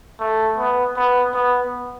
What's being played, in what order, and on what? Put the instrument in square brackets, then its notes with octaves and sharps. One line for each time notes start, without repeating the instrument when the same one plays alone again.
[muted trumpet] A3
B3
B3
B3